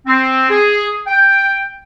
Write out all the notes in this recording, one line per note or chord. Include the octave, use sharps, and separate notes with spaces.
C4
G#4
G5